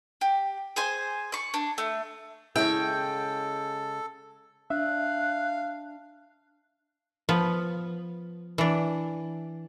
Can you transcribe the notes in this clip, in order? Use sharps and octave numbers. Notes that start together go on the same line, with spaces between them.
G4
G#4 C5 G#5
D5 C#6
D4
A3
C#3 G#3 E4 A4 C#5 G5
D4 E5 F5 F#6
F3 B3
E3 D4